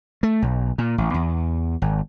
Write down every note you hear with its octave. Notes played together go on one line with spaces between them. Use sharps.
A3
B1
A#2
A1
E2
G#1